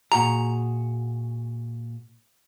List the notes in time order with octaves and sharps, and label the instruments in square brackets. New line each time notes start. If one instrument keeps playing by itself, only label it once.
[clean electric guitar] A#2 F#4 G#4 [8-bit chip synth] A#5